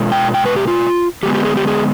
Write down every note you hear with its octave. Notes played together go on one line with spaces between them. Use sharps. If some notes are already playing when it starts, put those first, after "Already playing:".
Already playing: B2 G#3 D4 F4
G5
G5
B4
G4
F4
D3 G#3 B3 G4
G4
G#4
G4
G#4